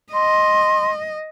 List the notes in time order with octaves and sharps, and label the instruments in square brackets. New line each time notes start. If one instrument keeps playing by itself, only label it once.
[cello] D#5 [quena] C6